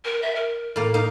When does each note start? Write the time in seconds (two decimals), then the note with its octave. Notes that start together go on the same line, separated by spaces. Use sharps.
0.05 A#4
0.22 E5
0.36 A#4
0.76 A2 A#3
0.94 A#3 D#4 F5